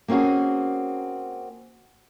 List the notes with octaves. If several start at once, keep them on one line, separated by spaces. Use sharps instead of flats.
A#3 C4 C#4 F#4 G#4